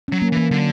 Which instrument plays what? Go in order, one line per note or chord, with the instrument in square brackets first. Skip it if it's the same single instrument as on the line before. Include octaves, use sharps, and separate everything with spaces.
[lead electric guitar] F#3 [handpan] C#4
[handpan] A#3
[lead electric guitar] E3 [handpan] A#3
[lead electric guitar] D3 [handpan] F#3